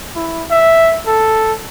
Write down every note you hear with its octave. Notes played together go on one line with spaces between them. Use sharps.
E4
E5
A4